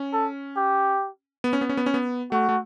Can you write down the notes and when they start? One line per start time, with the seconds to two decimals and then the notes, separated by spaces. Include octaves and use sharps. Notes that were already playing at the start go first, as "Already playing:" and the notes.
Already playing: C#4
0.13 A4
0.57 G4
1.44 B3
1.53 C#4
1.61 B3
1.69 C#4
1.77 B3
1.86 C#4
1.94 B3
2.32 A3 F#4
2.49 A3